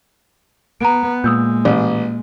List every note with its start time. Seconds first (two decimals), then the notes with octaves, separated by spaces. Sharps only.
0.81 B3 A#5 D7
1.24 A#2 G#3 D#6 E6 G6
1.65 A1